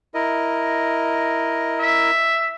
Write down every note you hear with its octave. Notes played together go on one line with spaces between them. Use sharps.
E4 A#4 D#5
E5